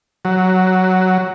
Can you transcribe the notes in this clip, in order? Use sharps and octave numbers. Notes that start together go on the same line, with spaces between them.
F#3